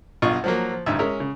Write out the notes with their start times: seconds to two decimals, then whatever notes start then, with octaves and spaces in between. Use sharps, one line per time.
0.22 B1 G2 F4 D#5 C#6 D#6
0.44 F3 F#3 A#3
0.72 F3
0.86 A1 D2 G2 D#4 E5
0.99 G#3 C#4 A#4 E5
1.20 C#3